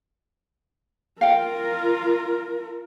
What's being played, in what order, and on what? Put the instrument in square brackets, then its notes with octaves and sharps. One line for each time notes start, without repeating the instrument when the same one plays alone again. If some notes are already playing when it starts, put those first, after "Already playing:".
[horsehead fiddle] F4 A#4 [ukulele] F5 G5